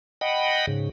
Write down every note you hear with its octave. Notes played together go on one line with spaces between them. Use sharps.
D#5 F#5 G5 B5
G#2 C#3